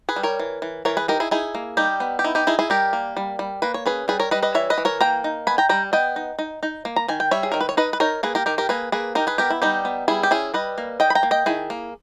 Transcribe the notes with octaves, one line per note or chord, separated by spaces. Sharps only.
G#4 B4
G3
A#4 C#5
E3
E3
E3 A#4 C#5
G#4 B4
D#4 G4 A#4
E4 G#4
D#4 E4 G#4
A#3
G3 D#4 G4
B3
G4
D#4 E4
D#4 G4
D#4 E4 G#4
E4 G#4
G3 G4 A#4
A#3
G3
G3
A#3 B4
C#5
C#4 G#4 B4
G3 G#4 B4
A#4 C#5
G3 B4 D#5
B4 D#5
E3 C#5 E5
B4 D#5
E3
A#4 C#5
A#3 G5 A#5
D#4
B3 G#5 B5
G5 A#5
G3 G5 A#5
B3 D#5 G5
D#4
D#4
D#4
A#3
A#5
D#3 G#5
G5
G3 C#5 E5
G#4
D#3 A#4
B4
C#5
D#4 B4 D#5
B4
D#4 A#4 C#5
A#3 G#4 B4
G4 A#4
D#3 G4 A#4
G4 A#4
A#3 G#4 B4
A#3 G#4 B4
D#4 G4 A#4
G#4 B4
B3 G4 A#4
E4
G3 D#4 G4
B3
G3 E4 G#4
G4
C#4 E4 G#4
G3 B4 D#5
A#3
D#3 D#5 G5
B5
G5 A#5
A#3
D#5 G5
D#3 E4 G#4
A#3